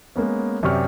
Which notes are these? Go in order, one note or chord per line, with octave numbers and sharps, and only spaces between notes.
G#3 A#3 B3 C#4
F#2 C3 G4 D5 C#6 F6